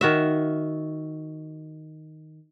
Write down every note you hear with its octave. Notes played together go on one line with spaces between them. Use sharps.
D#3 F#4 E5